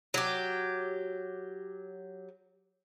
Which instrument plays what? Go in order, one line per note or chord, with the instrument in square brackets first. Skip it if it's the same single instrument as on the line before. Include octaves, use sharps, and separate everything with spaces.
[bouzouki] F#3 G4